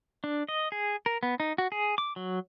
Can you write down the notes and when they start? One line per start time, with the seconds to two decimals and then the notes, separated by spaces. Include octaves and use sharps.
0.24 D4
0.48 D#5
0.72 G#4
1.06 A#4
1.23 B3
1.40 D#4
1.58 F#4
1.72 G#4
1.98 D6
2.16 F#3